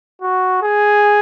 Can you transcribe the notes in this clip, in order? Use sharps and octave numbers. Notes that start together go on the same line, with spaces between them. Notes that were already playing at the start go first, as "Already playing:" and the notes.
F#4
G#4